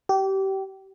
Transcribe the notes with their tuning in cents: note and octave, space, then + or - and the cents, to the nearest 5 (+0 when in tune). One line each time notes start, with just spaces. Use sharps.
G4 -25